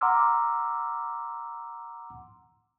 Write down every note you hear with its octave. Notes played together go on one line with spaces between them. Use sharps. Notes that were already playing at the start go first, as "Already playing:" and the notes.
F#5 A#5 C6 D6 E6 F6